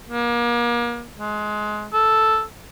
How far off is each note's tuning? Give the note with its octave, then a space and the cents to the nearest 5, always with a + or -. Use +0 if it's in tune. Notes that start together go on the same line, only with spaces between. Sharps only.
A#3 +35
G#3 +20
A4 -5